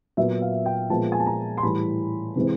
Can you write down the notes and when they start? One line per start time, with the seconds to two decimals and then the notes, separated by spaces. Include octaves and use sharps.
0.17 A#2 F#3 B3 E5
0.42 F5
0.66 G5
0.90 A#2 F3 G#3 B3 A5
1.12 G#5
1.20 A5
1.26 A#5
1.57 C6
1.63 A2 E3 G3 B5
2.36 C3 E3 G#3 C4